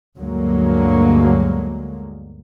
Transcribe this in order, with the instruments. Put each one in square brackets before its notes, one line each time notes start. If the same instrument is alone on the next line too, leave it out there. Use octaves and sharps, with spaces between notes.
[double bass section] D2 G2 D3 F#3 G#3 A#3